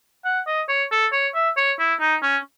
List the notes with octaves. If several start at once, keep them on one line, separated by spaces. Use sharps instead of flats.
F#5
D#5
C#5
A4
C#5
E5
C#5
E4
D#4
C#4